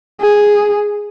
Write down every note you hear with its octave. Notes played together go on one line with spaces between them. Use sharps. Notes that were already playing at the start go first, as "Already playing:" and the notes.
G#4